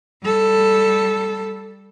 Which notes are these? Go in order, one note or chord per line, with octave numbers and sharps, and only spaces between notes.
G3 A4